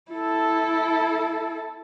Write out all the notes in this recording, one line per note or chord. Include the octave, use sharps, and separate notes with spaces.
E4 A4